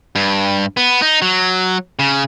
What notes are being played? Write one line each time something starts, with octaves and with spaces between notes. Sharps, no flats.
G2
B3
D#4
F#3
C#3